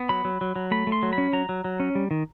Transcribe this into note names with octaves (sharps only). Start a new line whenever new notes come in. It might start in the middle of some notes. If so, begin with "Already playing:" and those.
Already playing: B3
F#3 B5
F#3
F#3
F#3
A3 B5
A3
C6
F#3
B5
C#4
F#3 A#5
F#3
F#3
C#4
G3
D#3